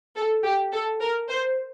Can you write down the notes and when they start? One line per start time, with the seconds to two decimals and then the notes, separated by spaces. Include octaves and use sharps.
0.16 A4
0.44 G4
0.72 A4
1.01 A#4
1.29 C5